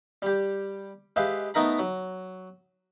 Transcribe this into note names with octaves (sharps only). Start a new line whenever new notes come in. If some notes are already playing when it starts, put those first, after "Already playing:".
G3 G4
G#3 G4 B4 E5 F5
A3 B3 D#4 A#4 A#5 B5
F#3